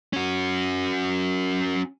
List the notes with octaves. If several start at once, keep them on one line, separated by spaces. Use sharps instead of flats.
C#4 F#4